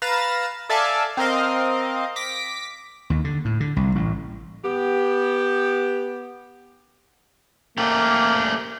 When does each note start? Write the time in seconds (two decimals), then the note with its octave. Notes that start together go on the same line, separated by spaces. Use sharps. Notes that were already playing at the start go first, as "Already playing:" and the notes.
0.02 B4 F5 A#5 A6 E7
0.69 A4 D5 E5 F5 G#5 A5
1.17 C4 A#4 D#5 F5
2.16 D6 A#6 B6
3.10 D#2
3.25 D3
3.45 A2
3.60 D3
3.76 C2
3.95 A1
4.65 B3 G4
7.78 A3 A#3 G4